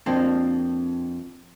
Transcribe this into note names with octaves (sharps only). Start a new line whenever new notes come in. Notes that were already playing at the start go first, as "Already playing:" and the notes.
F2 A#3 C4 D4